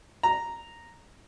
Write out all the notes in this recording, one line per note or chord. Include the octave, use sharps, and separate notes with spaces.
A#5